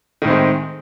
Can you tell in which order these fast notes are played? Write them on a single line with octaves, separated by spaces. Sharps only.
D#3 A2 C4 G#3